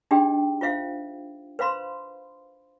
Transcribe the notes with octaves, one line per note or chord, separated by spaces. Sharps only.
D4 D#4 G4 G#4 D#5 G5
F4 C5 E5 F5
B4 C5 F5 B5 C6